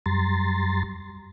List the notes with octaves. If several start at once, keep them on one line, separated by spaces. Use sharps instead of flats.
F#2 G3 A#5 C6 A6